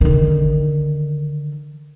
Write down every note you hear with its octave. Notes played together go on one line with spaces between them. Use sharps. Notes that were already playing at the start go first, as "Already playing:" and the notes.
D3 D#3